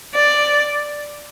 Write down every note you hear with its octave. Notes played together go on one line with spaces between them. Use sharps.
D5